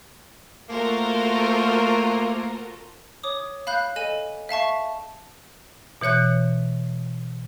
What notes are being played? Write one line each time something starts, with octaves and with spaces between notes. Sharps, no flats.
A3 A#3 F4 F#4 A4 A#4 C5
C#5 D6 D#6
F5 B5 F#6 G6
A4 D#5 G#5 D#7 E7
E5 F5 A5 C#6
B2 E3 C#5 F#6 G6